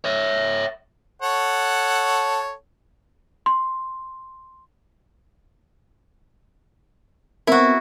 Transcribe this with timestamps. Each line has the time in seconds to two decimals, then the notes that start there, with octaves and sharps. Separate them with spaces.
0.04 C#5 E5
1.22 A4 C#5 F#5
3.46 C6
7.47 B3 C4 E4 F#4 A#4